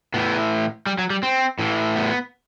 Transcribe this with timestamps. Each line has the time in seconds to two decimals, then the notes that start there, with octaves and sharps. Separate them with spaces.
0.14 A2 E3 B3
0.86 G3
0.99 F#3
1.10 G3
1.23 C4
1.59 A2 E3
1.96 B3